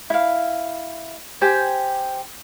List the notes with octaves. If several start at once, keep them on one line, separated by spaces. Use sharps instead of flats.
E4 F5
G4 C5 G5 G#5